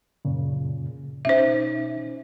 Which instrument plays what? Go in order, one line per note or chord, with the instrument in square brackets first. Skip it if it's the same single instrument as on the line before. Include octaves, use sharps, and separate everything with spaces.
[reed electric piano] F#2 A#2 C#3
[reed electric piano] B2 C#4 D#4 [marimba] C5 E5